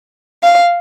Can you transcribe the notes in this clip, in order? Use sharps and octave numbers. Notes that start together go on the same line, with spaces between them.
F5